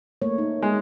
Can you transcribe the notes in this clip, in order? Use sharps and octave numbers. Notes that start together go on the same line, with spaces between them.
A3 A#3 C#5
D#4
G#3